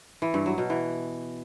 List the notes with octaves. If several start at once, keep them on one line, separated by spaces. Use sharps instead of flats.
E3
G2
F#3
B2
E3